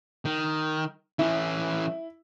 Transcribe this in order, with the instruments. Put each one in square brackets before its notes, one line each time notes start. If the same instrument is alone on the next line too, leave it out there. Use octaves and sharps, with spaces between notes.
[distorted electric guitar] D#3
[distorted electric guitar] E3 C#4 [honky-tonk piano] E4